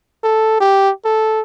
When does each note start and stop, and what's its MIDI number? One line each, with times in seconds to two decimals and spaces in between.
0.24 0.57 69
0.60 0.91 67
1.05 1.41 69